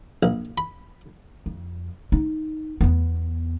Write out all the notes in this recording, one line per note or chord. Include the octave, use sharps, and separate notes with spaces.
A#1
B5
F2
D#4
E2 B3